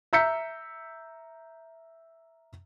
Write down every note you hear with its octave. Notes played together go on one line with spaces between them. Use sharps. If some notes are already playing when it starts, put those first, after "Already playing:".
E5 A#5 E6 G6 B6 C#7